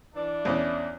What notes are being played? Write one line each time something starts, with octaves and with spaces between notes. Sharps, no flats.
E3 D4
E2 C#4 E4